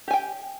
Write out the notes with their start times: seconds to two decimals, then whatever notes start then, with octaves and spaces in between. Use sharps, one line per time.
0.08 G4
0.11 G#5
0.13 G5